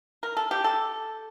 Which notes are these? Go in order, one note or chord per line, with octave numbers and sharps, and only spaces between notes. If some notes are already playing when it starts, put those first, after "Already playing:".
A#4
A4
G4
A4